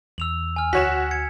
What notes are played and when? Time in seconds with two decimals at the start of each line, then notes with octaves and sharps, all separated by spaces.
0.18 E2 E6 F7 F#7
0.56 G#5 F6
0.73 D2 F#4 C#5 B6 E7
1.11 G#6 C#7